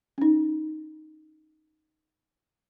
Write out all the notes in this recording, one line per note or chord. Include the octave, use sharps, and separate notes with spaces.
C#4 D#4